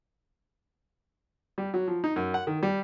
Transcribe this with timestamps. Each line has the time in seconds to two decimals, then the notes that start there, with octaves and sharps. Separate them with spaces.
1.58 G3
1.74 F#3
1.88 F3
2.04 D#4
2.16 F#2
2.34 F#5
2.47 D#3
2.63 G3